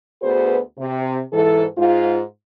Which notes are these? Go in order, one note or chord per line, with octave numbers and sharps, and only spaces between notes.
D2 B3 F#4 G#4 B4 C5
C3
G#2 E3 A4
G#2 F4